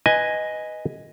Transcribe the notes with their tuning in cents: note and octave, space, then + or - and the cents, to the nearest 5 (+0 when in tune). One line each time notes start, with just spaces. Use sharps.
B4 +0 D#5 +5 G#5 +0